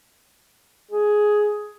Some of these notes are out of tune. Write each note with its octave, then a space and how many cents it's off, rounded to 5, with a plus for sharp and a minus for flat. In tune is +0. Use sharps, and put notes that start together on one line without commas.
G#4 +10